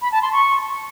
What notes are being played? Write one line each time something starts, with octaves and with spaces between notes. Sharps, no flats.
B5
A5
C6
C#6